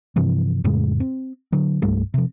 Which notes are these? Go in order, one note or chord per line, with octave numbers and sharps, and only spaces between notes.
G2 C3 E3 F3
F2 A2 C#3 G#3
C4
D3 F#3
C2 G2 G3 A3
C3 F3